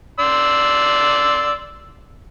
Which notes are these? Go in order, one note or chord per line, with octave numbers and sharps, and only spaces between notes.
D5 C6 E6